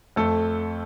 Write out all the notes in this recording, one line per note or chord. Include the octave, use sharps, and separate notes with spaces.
F2 A3 A4